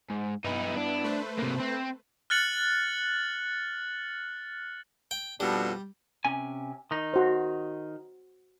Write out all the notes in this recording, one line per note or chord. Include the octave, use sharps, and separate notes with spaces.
G#2
G2 B3 D#4 E4 B4
D4
A3 B4 C5
C3 A#3
C4
F6 F#6 A6 C#7 F#7
G5
F2 B2 G3 D4
C3 C#4 G#5
D#3 D#4
F#4 C5